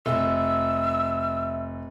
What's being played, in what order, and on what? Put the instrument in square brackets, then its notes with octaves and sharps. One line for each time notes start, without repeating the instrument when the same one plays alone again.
[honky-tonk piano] F1 [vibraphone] E5 [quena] E6